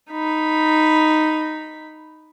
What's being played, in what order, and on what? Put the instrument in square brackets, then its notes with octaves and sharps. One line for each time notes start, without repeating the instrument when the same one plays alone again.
[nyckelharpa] D#4 B5